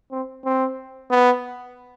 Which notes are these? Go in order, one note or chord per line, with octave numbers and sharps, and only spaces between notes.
C4
C4
B3